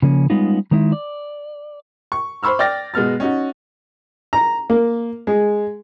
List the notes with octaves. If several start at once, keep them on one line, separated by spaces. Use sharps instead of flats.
C#3 F3 A#3 C#4
G3 G#3 B3 C#4 D#4 F4
D#3 G#3 D#4 E4
D5
C#6
C5 B5 C#6 E6 F6
D5 G5 F6 A6 A#6
B2 G#3 B3 F6 A6
C#4 D#4 F#4
A#5
A#3
G#3